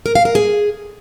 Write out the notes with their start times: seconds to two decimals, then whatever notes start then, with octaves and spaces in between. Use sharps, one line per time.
0.06 A#4
0.15 F5
0.25 A#4
0.35 G#4